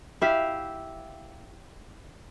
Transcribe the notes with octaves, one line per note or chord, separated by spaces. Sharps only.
E4 G4 E5 F5